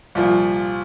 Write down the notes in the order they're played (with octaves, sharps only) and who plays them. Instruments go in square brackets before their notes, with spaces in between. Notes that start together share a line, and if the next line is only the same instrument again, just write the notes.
[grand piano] C2 A#2 F3